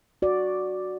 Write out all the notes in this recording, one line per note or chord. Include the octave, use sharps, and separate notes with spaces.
F#4 D5